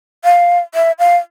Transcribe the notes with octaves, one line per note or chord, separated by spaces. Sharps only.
F5
E5
F5